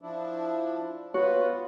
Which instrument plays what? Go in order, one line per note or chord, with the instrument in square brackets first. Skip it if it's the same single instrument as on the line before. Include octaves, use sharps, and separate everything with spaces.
[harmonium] F3 D4 E4
[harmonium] B3 F4 B4 [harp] F#4 [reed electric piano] C#5